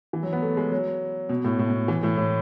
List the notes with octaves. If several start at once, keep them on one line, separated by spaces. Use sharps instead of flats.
E3
F#3
B3
A3
G#3
F#3
B2
A2
A2
B2
E3
A2
A2